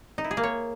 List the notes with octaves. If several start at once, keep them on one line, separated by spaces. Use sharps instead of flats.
D#4
E4
G#4
A#3
C#5